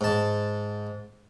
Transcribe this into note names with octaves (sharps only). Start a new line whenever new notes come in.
G#2 A5